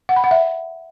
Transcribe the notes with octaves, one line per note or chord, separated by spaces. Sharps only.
F#5
B5
F#5
E5